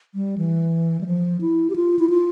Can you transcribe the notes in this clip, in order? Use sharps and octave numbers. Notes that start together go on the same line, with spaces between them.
G3
E3
G3
F3
E4
G4
F4
E4
F4